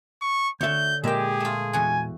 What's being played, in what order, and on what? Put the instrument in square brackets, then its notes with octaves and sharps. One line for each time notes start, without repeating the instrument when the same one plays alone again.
[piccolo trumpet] C#6
[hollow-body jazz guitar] D2 E5 [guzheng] D3 C#5 [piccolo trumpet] G6
[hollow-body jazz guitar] A#2 G#3 A#4 [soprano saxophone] G4 [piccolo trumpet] G#4 [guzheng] E5 G5
[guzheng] A3 F4
[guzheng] E2 F#4 [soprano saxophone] G#5